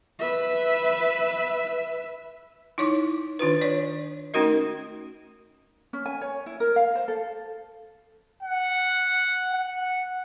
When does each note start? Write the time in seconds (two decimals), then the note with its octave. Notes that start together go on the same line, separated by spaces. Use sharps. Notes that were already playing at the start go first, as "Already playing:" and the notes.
0.19 B4 E5
2.78 D#4 E4 C#5 C#6 D6
3.39 D#3 D4 F4 B4
3.61 C#5 D5
4.34 A3 C#4 D#4 F#4 A#4 D#5
5.93 C#4
6.06 G#5
6.21 C#5
6.46 E4
6.60 A#4
6.76 F5
6.95 C5
7.08 A4
8.43 F#5
9.53 F#5